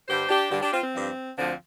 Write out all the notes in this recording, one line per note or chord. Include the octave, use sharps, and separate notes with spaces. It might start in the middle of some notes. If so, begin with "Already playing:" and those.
G2 D3 G3 G4 C5
D4 G4
G2 D3 G3 D4 G4
D4 G4
C4 F4
C4
G2 F3
D2 D3 F3 C4